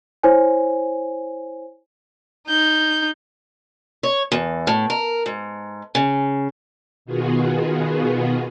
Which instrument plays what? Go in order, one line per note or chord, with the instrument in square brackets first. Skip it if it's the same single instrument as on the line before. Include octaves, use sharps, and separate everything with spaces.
[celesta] E4 C5 C#5 G#5
[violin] D#4 G6
[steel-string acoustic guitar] C#5
E2
A2
A#4
G#2
C#3
[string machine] B2 D#3 B3 F4 F#4 G#4